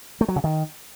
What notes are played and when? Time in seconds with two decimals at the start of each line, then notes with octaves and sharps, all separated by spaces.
0.21 A3
0.28 F#3
0.36 C#3
0.44 D#3